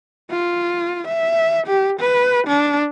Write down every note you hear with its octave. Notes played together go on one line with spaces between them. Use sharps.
F4
E5
G4
B4
D4